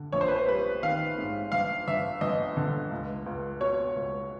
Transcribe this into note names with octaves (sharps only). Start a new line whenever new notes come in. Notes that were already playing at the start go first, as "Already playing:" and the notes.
Already playing: D3
A#1 C#5
C5
B4
C5
G3 B4
D#3 F5
G#2
G1 F5
G1 E5
G1 D#5
D3
C#2
C#2
B2 C#5
C#2